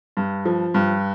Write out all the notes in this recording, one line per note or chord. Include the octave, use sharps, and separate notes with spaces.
G2
F3
G2